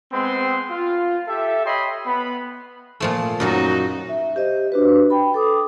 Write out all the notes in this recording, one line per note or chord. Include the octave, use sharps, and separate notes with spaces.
G#3 B3 C4 G5 C6
F4
G4 A4 E5
C#5 D#5 G5 B5 C6
B3 B5
A#2 F3 A3
F#2 A#2 F#3 D#4 F#4
E5
G4 C5 D#5
D4 F#4 B4
G5 B5
A4 D6 D#6